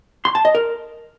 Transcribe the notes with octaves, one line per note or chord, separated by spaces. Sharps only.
C6
A5
D#5
A#4